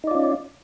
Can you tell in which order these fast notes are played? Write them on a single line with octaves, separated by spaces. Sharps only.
D#4 D5 F4 C#4